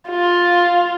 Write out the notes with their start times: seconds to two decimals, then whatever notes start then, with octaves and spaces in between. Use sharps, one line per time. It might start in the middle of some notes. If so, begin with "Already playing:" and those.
0.10 F4